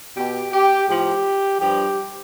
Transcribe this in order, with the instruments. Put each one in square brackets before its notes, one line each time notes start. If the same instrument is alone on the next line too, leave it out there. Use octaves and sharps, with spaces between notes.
[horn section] B2 G4
G4
A2 F3 G4
G2 F3 G4